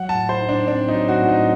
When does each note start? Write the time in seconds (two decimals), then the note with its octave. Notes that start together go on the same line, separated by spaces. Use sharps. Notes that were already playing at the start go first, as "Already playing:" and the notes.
Already playing: F#3 F#5
0.09 A5
0.15 A2
0.29 C5
0.42 D#4
0.49 D4
0.68 C4 D4
0.88 D#4
0.95 F#3
1.08 F#4
1.22 A2
1.29 D#4